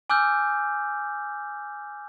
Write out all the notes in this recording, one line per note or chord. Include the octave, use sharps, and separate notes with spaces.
G#5 D6 E6 F6 G6